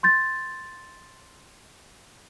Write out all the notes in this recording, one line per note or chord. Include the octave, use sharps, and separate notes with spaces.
C6 G6 A6